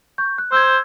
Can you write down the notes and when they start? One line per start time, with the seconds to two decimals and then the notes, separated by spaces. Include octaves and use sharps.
0.18 C#6 G6
0.38 F#6
0.52 C5 E6 G6 G#6